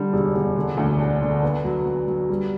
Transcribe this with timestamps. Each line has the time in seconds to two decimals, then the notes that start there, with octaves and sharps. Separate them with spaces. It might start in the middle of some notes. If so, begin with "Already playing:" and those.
Already playing: D3 G3
0.13 E1
0.35 E1
0.56 D3
0.77 D2
0.99 D4
1.21 D3
1.43 B3
1.64 F#3
1.85 F#3
2.07 F#3
2.29 G3